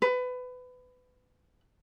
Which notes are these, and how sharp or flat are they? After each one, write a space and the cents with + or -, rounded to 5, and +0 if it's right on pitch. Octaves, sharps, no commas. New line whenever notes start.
B4 +25